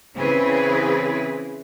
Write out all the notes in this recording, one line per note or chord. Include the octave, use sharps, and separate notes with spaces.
C#3 E3 C4 E4 G#4 B4